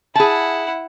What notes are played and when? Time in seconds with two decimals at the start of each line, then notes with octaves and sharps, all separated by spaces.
0.16 E4 G#4 F#5 A5